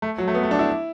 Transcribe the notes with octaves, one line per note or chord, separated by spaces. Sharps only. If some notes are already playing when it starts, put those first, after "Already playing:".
A3
F#3
A3
B3
A3
D4
E4